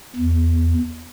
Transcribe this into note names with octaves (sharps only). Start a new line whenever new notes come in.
E2